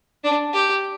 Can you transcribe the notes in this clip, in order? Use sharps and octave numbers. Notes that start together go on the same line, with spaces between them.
D4
G4